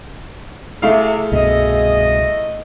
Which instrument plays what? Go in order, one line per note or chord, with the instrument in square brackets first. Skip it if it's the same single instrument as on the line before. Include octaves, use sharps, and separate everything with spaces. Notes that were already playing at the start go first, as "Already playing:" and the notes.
[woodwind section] C3 [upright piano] A3 E4 F5 [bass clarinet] G#4
[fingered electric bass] C2 G2 B2 [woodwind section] D#5